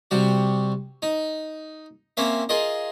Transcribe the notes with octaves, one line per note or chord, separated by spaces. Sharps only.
C3 G3 F#4
D#4
A#3 C4 C#4 E5
F4 G#4 A#4 D#5